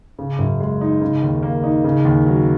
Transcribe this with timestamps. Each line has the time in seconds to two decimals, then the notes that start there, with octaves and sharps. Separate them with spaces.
0.19 C#3
0.39 F#2
0.60 G#3
0.81 D#4
1.01 C#3
1.23 D#2
1.43 A#3
1.64 D#4
1.84 C#3
2.05 D#2
2.26 F#3